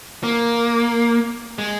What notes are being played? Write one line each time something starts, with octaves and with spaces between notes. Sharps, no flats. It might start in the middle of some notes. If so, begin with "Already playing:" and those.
A#3
G#3